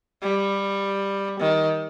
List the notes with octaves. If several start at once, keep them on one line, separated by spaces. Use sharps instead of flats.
G3
D#3